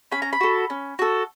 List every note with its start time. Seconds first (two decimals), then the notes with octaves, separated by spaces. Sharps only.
0.12 C#4 B5
0.22 A#5
0.33 B5
0.41 F#4 A4
0.70 C#4
0.99 F#4 A4